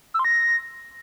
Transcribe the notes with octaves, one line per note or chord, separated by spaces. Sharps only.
E6
C6
A#6